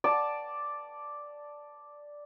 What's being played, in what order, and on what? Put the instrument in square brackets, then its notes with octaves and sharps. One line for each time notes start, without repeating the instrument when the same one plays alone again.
[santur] D5 A5